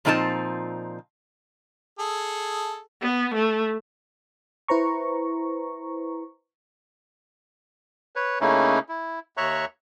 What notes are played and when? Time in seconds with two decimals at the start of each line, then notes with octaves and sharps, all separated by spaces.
0.05 A#2 F3 C4 D#4 A#4 A5
1.99 G#4 A4
3.02 B3
3.34 A3
4.68 E4 B4 C5 A#5 C#6
8.16 B4 C#5
8.41 C#3 A3 A#3 C#4 D#4 E4
8.89 E4
9.37 D#2 C#5 E5 A#5 C#6 F#6